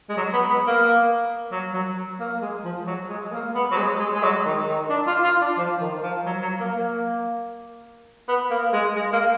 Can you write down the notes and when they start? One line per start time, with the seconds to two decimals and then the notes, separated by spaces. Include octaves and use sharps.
0.10 G#3
0.17 F#3
0.33 B3
0.50 B3
0.67 A#3
1.52 F#3
1.74 F#3
2.20 A#3
2.42 G#3
2.65 F3
2.87 F#3
3.09 G#3
3.24 G#3
3.32 A#3
3.55 B3
3.72 F#3
3.77 G#3
4.00 G#3
4.15 G#3
4.23 F#3
4.45 D#3
4.68 D#3
4.90 D4
5.07 F4
5.24 F4
5.41 D4
5.58 F3
5.81 D#3
6.03 F3
6.26 F#3
6.42 F#3
6.60 A#3
6.77 A#3
8.29 B3
8.51 A#3
8.73 G#3
8.96 G#3
9.13 A#3